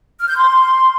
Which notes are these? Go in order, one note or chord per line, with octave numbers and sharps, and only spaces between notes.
F6
G6
C6